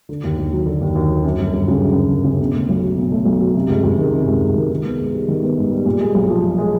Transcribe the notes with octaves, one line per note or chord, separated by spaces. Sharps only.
D3
D#2
D#2
F#3
D3
D#2
D#2
F#3
F#2
G1
G1
C#3
F#2
G1
G1
C#3
B2
A3
B1
F#3
B2
A3
B1
F#3
C3
C#2
C#2
D#3
C3
C#2
C#2
D#3
D#3
B3
G#2
G3
D#3
B3
G#2
G3
A#2
G#3
B1
F3
A#2
G#3